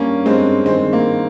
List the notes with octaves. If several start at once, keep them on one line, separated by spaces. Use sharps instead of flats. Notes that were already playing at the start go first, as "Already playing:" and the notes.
Already playing: G2 A#3 C#4
G2 G#3 C4
D#3 G#3 C4
A#3